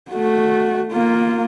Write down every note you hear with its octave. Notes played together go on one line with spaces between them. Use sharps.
A3 F#4
A#3 F4